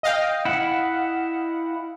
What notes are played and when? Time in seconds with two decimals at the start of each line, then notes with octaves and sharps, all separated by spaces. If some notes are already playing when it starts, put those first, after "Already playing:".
0.03 D#5 F5 G5
0.45 E4 F#5